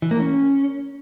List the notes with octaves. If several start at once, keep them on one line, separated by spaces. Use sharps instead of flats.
E3
A#3
C#4